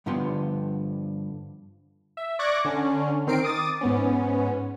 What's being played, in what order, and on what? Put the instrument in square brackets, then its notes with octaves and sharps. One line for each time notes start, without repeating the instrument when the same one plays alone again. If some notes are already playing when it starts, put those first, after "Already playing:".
[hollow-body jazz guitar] G2 D3 F3 B3 C6
[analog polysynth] E5
D5 C#6 D6 F#6 G#6 A#6
D3 C#4
D#3 C4 A#4 C7 D7
D6 D#6 A6
G#2 B3 C#4